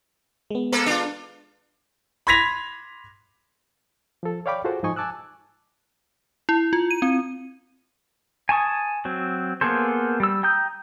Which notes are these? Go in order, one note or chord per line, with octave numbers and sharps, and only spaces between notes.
G#3 B3
A#3 A4 B4
D4 F4
B5 C6 G#6 A#6 B6 F7
F3 A4
C#5 D5 F5 G5 B5 D6
F4 F#4 G#4 A4 C5 F#5
G#2 F3 D#4 D#5 G#5 C#6
G#5 A5 D6 E6 F#6
E4
F4
D#7
C4
G#5 A5 C#6 D#6
F#3 C4
A#3 B3 G#4 A4 C5
G3 E6
G5 A#5 D#6 G6